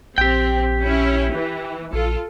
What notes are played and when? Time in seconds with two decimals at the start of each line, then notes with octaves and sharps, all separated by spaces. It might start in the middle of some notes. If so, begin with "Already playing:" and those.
0.18 A#1 C4 G4 G5
0.83 C#4 E4
1.32 E3
1.93 A#1 F4 A4